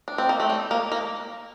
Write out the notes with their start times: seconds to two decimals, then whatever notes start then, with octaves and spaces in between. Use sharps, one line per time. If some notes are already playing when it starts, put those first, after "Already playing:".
0.08 D4
0.18 C4
0.29 A#3
0.40 A3
0.50 G3
0.71 A#3
0.92 A#3